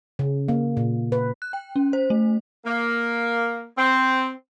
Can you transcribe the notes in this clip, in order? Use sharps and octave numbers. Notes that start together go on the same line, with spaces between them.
C#3
A#3
A#2
B4
F#6
G5
C#4
C5
A3
A#3
C4